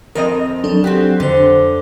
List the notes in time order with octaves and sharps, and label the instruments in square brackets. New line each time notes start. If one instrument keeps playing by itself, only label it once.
[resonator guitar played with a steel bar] F2 C4 D#5 [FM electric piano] A#4
[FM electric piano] F#3 D4 A4
[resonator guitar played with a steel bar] C4 F#4 G4
[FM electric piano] F2 C5 [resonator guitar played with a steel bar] D3